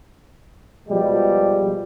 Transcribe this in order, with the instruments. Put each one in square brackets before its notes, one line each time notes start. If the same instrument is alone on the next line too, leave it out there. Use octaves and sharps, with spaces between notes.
[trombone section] B2 F3 G3 G#3